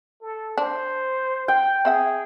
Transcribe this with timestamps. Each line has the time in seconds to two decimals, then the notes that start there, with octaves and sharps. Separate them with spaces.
0.21 A4
0.58 D4 C5
1.48 G5
1.85 C4 G#4 E5 F#5